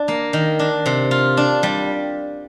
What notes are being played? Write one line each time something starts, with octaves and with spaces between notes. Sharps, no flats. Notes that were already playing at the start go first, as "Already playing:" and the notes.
Already playing: D4
A#3
D#3
D4
C3
F4
D4
G3